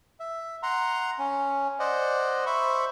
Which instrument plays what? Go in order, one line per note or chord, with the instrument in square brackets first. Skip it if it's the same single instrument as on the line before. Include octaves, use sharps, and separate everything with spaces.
[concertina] E5
F#5 A#5 C6
C#4
C5 D5 D#5 F#5
C5 E5 B5 C#6